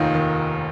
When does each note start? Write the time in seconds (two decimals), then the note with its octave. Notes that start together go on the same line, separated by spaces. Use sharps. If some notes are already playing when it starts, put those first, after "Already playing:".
Already playing: F1 D#2 D#3 D#4 F4
0.14 D#3